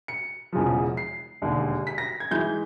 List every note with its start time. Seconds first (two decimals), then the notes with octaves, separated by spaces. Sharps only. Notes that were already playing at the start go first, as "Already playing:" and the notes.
0.08 C#7
0.53 E1 E2 C#3 F3
0.97 C7
1.42 E1 D#2 D3
1.87 B6
1.98 A#6
2.20 G#6
2.31 G#2 E3 G#3 G6